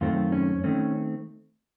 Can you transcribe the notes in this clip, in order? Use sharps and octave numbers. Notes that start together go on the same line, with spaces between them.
F#2 D#3 A3 C4 F4
C#4
D#3 A3 C4 C#4